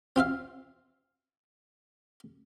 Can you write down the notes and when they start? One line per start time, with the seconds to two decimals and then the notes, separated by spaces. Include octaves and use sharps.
0.16 C4 F4 E5 F5